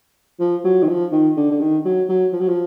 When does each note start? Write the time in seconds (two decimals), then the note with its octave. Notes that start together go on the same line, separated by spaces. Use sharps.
0.40 F3
0.64 F#3
0.83 D#3
0.89 F3
1.12 D#3
1.37 D3
1.51 D3
1.61 D#3
1.85 F#3
2.09 F#3
2.33 F3
2.40 F#3
2.48 F3